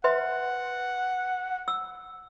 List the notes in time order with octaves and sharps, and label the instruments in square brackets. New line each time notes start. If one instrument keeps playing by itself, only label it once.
[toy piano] B4 E5 C6 [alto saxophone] F#5
[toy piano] E6